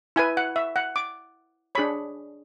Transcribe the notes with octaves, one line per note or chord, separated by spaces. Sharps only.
E4 B4 G#5
F#5
E5
F#5
D6
D4 G#4 C#5 B5